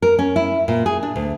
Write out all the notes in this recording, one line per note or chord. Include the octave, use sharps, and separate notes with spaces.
A#4
C#4
E4
A#2
G#4
D4
D2